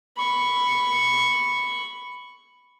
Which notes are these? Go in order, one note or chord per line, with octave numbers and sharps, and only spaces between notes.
B5 C#6